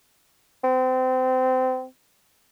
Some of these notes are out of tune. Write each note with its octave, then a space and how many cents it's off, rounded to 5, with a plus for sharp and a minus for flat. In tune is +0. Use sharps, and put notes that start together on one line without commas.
C4 -25